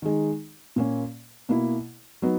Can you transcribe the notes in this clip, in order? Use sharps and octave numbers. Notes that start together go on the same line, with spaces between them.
D#3 G#3 D#4
A#2 A#3 C#4
B2 A#3 E4
F#3 B3 D#4